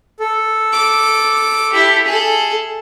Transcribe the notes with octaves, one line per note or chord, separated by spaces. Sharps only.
A4
D6
E4 G4
G#4 A4